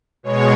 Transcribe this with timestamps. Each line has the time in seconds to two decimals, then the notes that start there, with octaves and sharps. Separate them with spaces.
0.23 B2 G#3 C#5